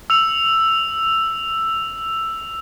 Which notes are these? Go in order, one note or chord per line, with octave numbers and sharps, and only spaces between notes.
E6 F7